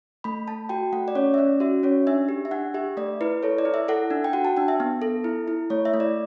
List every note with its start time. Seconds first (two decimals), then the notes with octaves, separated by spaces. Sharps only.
0.24 A3 B5
0.48 A3 A5
0.69 F#4 G5
0.93 A3 F#5
1.08 D5
1.15 C#4 C#5
1.34 E5
1.38 C#4 D5
1.60 F#4 E5
1.83 C#4 C#5
2.07 D4 E5
2.29 G4
2.45 E5
2.51 D4 F#5
2.74 G4 E5
2.97 A3 D5
3.21 E4 B4
3.43 A4 C#5
3.58 D5
3.65 E4
3.74 E5
3.88 A4 F#5
4.10 D4
4.24 G5
4.33 F#4 F#5
4.45 A5
4.57 D4 G5
4.68 E5
4.80 B3
5.02 A4
5.24 E4
5.48 E4
5.70 A3 C#5
5.85 E5
5.94 A3
6.00 D5